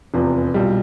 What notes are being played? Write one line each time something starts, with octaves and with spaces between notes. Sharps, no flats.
F1 E2 C3 F3
B1 A#2 G3